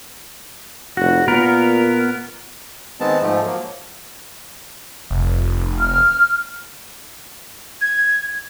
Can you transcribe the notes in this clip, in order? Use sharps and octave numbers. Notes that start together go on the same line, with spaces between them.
F1 F#4
A#2 B3 A#4
D#3 G#3 B3 C4 A5
G#2 F3 A3
F3 F#3 A#3
F1
F6
G#6